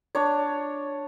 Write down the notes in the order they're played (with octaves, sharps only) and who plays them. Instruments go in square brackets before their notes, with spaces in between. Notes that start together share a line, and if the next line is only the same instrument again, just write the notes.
[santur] D4 C#5